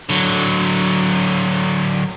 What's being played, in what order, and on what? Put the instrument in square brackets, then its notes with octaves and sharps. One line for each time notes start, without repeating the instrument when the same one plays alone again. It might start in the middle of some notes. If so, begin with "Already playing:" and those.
[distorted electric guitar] D3 F#3